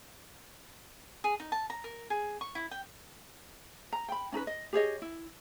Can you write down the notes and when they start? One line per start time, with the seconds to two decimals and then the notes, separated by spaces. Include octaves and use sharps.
1.24 G#4
1.40 D#4
1.52 A5
1.70 A#5
1.84 A#4
2.10 G#4
2.41 C#6
2.55 E4
2.71 G5
3.93 A#5
4.09 G5 B5
4.32 C#4 D#4 A4 B4
4.47 D#5
4.73 G4 G#4 C#5 D#5
5.02 E4